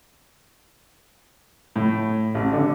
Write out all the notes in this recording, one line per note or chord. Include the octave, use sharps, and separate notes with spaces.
A2
A1
D3